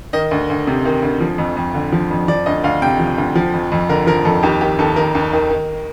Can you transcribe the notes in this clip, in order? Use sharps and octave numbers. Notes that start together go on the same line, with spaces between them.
D#3 D#5
D2
D2
C3
D#3
D2
F3
F2
F2
D3
F3
F2
F3 D5
D2 D#5
D2 F5
C3 G5
F3
D2
F3
F2
F2
D3 A#4
F3 A#4
F2 A4
D#2 G4
D#3 G4
D#2 A4
D#3 A#4
D#2
D#3
D#3